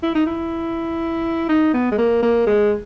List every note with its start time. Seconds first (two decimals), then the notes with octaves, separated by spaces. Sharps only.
0.03 E4
0.15 D#4
0.26 E4
1.49 D#4
1.74 B3
1.92 G#3
1.98 A#3
2.22 A#3
2.46 G#3